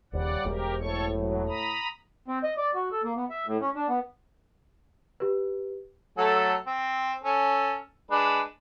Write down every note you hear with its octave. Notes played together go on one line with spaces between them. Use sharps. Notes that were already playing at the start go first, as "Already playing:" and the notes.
D#1 C#3 G3 C5 D5 F#5
E1 G#3 G4 A#4
A2 A4 C#5 C#6
F#3
A#5 B5 D#6
C4
D#5
D5
F#4
A4
A#3
B3
E5
A2
C#4
D4
B3
G4 B4
F#3 A3 A4
C4
C#4 A4
G#3 D4 B4